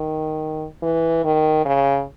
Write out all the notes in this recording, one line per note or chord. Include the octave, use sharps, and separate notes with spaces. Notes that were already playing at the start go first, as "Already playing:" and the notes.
Already playing: D#3
E3
D#3
C#3